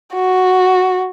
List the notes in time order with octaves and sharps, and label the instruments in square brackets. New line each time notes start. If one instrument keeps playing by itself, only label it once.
[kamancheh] F#4